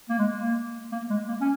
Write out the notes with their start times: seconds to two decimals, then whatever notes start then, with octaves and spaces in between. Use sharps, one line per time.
0.09 A#3
0.19 G#3
0.38 A#3
0.92 A#3
1.10 G#3
1.28 A#3
1.41 C#4